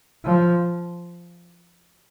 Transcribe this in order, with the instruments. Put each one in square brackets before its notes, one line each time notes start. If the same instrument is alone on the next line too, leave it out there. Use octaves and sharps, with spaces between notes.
[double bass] F3